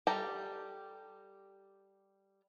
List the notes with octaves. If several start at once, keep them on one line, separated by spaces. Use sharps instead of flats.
G3 G4 A4 A#5